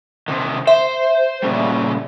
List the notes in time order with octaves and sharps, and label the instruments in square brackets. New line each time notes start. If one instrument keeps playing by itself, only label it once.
[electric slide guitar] C3 D#3
[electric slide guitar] C5 [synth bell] E5
[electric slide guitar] A#2 C#3 G3